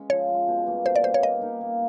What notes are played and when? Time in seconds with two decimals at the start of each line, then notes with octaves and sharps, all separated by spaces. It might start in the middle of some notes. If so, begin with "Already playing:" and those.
Already playing: G#3 C#4
0.10 F3 C#5
0.29 G#3 C#4
0.48 B2
0.66 G3 A#3
0.86 B2 C5
0.96 D5
1.04 G3 A#3 C5
1.14 C#5
1.23 A#3 D#5
1.41 D#4 G4 A#4
1.61 A#3